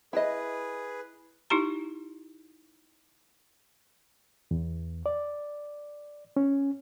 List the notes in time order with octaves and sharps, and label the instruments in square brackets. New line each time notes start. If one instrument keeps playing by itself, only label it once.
[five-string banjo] E4 D#5 [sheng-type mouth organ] G#4 B4
[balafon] D#4 E4 G4 A#5
[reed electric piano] E2
D5
C#4